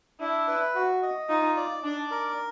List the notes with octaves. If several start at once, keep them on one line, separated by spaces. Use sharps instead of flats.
D4 E4
B4
F#4
D#5
D#4 F4
D5
D4 D5
A#4